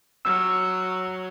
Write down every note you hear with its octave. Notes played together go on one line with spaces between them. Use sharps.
F#3 E6 F6